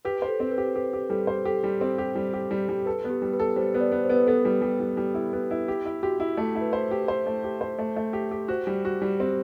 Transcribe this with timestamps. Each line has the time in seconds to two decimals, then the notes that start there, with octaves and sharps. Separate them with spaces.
0.05 G4 B4
0.22 C5
0.28 A4
0.40 C4
0.51 B4
0.58 G4
0.75 G4 B4
0.93 G4
1.10 G3 A4
1.27 C5
1.45 G4 A4
1.64 G3
1.81 C4
1.98 G4
2.16 G3
2.33 G4
2.51 G3
2.69 G3
2.86 A4 B4
3.04 B3
3.10 G4
3.22 G3
3.33 B4
3.40 A4
3.56 G3 C5
3.74 B3
3.80 D5
3.92 B3
4.04 C5
4.10 B3
4.16 B4
4.27 B3 A4
4.45 G3
4.62 G3
4.80 G3
4.97 G3
5.14 E4
5.33 B3
5.51 E4
5.68 G4
5.85 E4
6.03 F#4 G4
6.20 E4
6.37 A3 A4
6.55 E4
6.61 B4
6.73 C5
6.91 G4
7.08 C5
7.26 A3
7.44 G4
7.61 C5
7.79 A3
7.96 A3
8.13 G4
8.31 G4
8.48 F#4 C5
8.67 G3
8.85 F#4
9.02 G3
9.20 C4